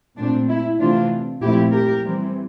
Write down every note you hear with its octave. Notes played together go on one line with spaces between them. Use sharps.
A#2 A3 C4 D4
E4
C3 E3 A3 C4 D4 F4
A#2 F3 A3 C4 E4 G4
G4 A#4
E3 G3 C4